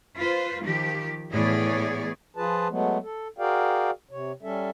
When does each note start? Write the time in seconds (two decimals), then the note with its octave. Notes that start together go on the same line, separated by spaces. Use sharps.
0.19 F4 B4 C5
0.64 D#3 F3 G4
1.31 A2 E3 B3 G#4 C#5 D5
2.37 F3 F4 G#4 B4 A5
2.70 F#3 G#3 A3 B3
3.03 A4
3.39 F#4 G#4 A#4 D5 F5 G5
4.11 C3 C#5
4.43 G3 C#4 A4 E5